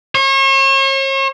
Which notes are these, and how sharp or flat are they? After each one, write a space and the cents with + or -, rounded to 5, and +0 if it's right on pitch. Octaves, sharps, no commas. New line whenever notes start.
C#5 -40